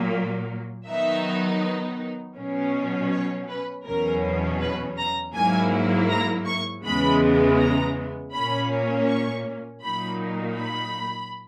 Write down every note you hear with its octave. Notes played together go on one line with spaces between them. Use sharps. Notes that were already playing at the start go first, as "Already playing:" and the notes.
Already playing: A#2 F#3 A#3
D#3 F#3 B3 D#4 E5
B2 F#3 C#4
C#5
B4
E2 B2 F#3 C#4 A#4
B4
A#5
G#2 F#3 A#3 E4 G#5
A#5
C#6
E2 C#3 E3 G#3 B3 B5
A#5
A#2 A#3 C#4 B5
C#6
A#2 F#3 A#3 D#4 B5
B5